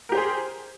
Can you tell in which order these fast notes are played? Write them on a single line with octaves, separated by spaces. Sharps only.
A#4 G4 C5 G#4